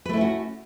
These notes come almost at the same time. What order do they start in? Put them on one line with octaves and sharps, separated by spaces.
B4 A3 E4 C#4 F#4